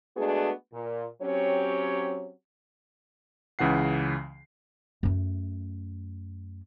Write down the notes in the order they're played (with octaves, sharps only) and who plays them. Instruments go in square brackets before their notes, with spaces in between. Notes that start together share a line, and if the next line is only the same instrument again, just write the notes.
[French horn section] G#3 A3 B3 D4 F#4 G#4
A#2
F#3 C4 C#4 G4 C#5
[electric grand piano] C#2 C#3 E3 F#5 C7
[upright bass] F#2 A3